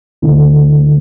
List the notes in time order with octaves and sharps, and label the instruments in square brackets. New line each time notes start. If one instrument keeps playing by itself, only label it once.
[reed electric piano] D2 D3 A3 E4